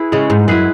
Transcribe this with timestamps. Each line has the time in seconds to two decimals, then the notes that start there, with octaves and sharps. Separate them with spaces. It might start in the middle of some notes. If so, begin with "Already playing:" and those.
Already playing: E4 G#4 B4
0.12 C#3 G#3
0.30 G#2
0.48 F#2 E4 G#4 B4